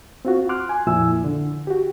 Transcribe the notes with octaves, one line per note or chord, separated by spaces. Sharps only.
C4 F4 F#4
C6 D6 F6 F#6
G#5
F2 A#2 F3 E4 G#5 E6
D3
F#4 G4